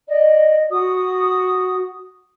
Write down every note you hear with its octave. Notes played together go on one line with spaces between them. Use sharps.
D5 D#5
F#4 D#6